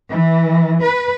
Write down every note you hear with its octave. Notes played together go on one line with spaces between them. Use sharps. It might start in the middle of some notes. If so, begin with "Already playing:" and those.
E3
B4